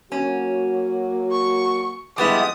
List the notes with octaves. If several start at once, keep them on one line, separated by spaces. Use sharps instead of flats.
F#3 A#3 C#4 F#4
C#6
F2 G3 G#3 B3 E4 D#6